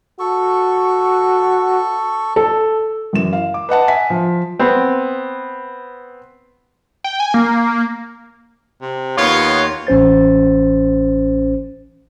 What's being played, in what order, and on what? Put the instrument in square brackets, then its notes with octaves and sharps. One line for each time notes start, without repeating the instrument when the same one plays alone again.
[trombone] F#4 [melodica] A4 C#6
[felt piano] A4
F#2 E3 E7
F5
D6
B4 D#5 F#5 A5
E5 G#5 B6
F3
[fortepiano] B3 C4
[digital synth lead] G5
G#5
A#3
[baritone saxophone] C3
[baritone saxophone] D#2 [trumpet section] B3 F4 [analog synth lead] C#5
[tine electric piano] A1 C#4 C5 A6